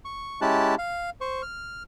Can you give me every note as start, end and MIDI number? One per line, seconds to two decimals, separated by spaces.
0.05 0.40 85
0.41 0.75 56
0.41 0.75 61
0.41 0.75 64
0.41 0.75 67
0.41 0.75 81
0.41 0.75 90
0.78 1.10 77
1.21 1.42 72
1.21 1.42 85
1.42 1.83 89